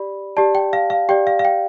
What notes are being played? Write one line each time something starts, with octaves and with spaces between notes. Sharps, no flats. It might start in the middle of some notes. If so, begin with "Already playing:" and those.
Already playing: G4 D5 B5
G4 D5 A5
G5
F5
F5
G4 D5 G5
F5
F5
G5